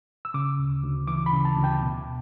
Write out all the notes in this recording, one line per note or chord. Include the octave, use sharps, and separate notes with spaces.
E6
C#3 D6
D2
D2
E3 D6
B5
C#3
A5
D2
G5
B2